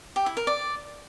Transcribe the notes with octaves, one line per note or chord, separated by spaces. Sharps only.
G4
E4
A#4
D5